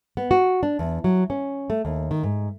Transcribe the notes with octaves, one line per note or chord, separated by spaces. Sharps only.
B3
F#4
D4
E2
F#3
C#4
A3
D#2
D#3
G#2